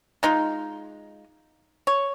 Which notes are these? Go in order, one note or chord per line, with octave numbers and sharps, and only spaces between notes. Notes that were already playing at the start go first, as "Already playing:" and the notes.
G#3 D#4 F4
C#5